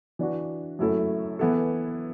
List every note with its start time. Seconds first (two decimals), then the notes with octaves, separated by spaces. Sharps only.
0.19 E3 D4 F#4
0.79 F#2 F#3 A3 E4 A4
1.39 E3 B3 E4 A4